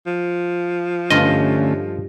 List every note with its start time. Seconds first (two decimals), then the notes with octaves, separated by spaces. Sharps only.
0.07 F3
1.10 G2 D3 A3 C#4 F4 D#5